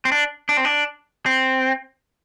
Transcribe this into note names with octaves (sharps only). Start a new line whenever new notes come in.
C4
D4
D4
C4
D4
C4